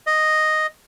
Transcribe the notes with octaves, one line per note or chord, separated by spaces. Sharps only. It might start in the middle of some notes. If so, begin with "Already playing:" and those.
D#5